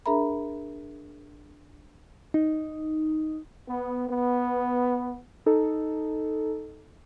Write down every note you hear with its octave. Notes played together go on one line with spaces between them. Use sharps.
D4 G#4 A#4 E5 A#5 B5
D#4
B3
B3
D#4 A4